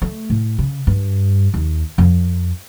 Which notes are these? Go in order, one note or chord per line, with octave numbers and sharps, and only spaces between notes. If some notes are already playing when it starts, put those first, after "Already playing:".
A3
A2
C#3
G2
D#2
F2